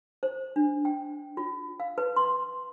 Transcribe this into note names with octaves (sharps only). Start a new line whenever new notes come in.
C5
D4
G5
F4
F5
B4
C6